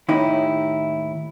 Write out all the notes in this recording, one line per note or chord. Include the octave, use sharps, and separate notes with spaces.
D#2 A2 C#4 D#4 E4